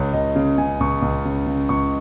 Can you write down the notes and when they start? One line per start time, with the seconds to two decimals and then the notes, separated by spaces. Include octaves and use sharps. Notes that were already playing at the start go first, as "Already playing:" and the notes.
Already playing: C#2 C#5
0.13 C#2 D#5
0.36 C#3
0.58 C#3 G#5
0.81 C#2 C#6
1.02 C#2
1.25 C#3
1.47 C#3
1.69 C#2 C#6